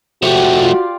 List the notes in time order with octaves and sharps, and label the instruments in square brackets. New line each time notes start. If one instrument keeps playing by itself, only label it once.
[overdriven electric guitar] F3 A3 [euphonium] F#4 [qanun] G4 F#5
[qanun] F4 D5